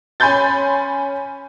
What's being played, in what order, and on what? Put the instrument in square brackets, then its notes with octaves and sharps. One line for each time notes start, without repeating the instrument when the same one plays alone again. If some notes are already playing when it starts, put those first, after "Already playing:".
[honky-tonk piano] C#4 G#5 B5 C6 G6 A6